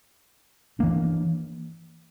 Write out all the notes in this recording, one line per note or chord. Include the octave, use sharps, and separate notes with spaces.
E3 A#3 D4